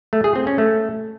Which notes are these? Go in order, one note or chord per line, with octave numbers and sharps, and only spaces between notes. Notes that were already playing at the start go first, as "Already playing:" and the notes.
A3
G#4
C4
C#4
A3